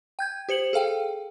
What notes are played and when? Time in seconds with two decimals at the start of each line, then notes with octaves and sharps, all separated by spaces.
0.19 G5 G6 G#6
0.49 G4 C5 C#7 F#7
0.73 G#4 A4 F5 G5